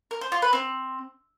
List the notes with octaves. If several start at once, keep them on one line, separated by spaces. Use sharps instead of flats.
A#4
C5
F4
B4
C4